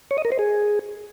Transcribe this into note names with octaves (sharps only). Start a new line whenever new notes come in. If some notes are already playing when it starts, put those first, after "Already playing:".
C#5
D#5
A#4
C5
G#4